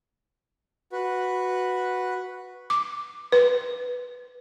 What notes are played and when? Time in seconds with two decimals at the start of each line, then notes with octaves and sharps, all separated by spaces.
0.92 F#4 B4
2.70 D6
3.32 B4